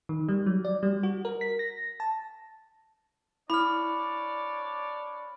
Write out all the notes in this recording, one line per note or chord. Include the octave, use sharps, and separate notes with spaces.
D#3
G3
F#3
D5
G3
F#4
A#4
B6
A#6
A5
D4 E4 C#5 D5 B5 F6